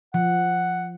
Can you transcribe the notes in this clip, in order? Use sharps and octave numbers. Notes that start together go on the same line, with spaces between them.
F3 F#5